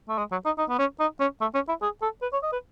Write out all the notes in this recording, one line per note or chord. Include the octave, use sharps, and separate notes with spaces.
A3
G#3
F#3
D#4
D#4
B3
C#4
D#4
C#4
A3
C#4
E4
G#4
A4
B4
C#5
D#5
B4